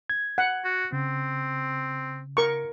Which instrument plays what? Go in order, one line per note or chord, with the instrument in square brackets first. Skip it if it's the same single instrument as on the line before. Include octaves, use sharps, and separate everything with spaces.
[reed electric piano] G#6
[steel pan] F#5
[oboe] F#4
[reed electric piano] C#3 [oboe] C4
[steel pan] A#4 C#6